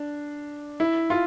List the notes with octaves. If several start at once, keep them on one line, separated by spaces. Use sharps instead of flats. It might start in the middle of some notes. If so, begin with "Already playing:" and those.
Already playing: D4
E4
F4